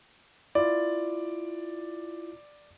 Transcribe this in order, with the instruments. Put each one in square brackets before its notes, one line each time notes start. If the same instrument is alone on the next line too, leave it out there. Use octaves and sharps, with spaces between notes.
[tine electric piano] E4 F4 [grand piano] D5